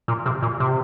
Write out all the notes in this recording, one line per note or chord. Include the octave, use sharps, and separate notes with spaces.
A#2
C3
A#2
C3